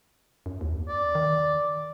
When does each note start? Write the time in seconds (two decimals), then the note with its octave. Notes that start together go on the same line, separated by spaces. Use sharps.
0.46 F#2
0.61 D#2
0.88 D5
1.15 D#3